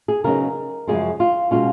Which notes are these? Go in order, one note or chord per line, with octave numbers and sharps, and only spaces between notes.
G#4
C#3 F#3 B3 D#4 A#4
F#2 C#3 F3 G#3 G#4
F4
B2 G#3 C#4 F4